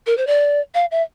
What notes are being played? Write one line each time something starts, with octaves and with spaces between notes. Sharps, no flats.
A#4
C5
D5
F5
E5